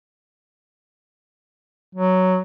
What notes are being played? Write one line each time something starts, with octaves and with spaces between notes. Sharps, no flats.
F#3